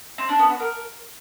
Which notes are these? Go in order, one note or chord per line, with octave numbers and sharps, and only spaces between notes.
C4
D4
B3
F#4
A#4